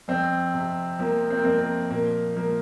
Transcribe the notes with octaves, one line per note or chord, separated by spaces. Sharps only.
F2 C4
C3
F3 A#3
C4
A#3
F2 C4
A#3
A#2 A#3
F3 A#3